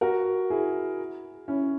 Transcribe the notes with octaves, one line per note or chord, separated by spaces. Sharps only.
F#4 A#4
E4 G#4
C#4 E4